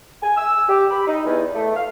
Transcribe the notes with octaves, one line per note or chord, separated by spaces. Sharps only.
G#5
E6
G4
B5
D#4
E2
A3
F5